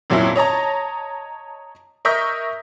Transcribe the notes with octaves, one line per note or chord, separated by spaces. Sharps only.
F2 A#2 F#3 C#4 E4
C#5 D#5 A5 A#5
A#4 D#5 E5 C#6 G6